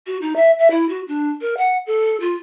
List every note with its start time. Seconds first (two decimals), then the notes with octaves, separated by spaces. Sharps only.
0.07 F#4
0.22 D#4
0.36 E5
0.59 E5
0.71 E4
0.89 F#4
1.08 D4
1.41 A#4
1.57 F#5
1.87 A4
2.20 F4